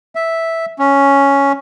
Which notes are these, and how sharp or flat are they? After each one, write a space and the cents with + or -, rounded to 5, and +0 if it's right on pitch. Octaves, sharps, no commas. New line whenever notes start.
E5 -5
C#4 +5